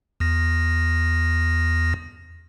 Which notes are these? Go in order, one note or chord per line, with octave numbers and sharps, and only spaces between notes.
E2 A#6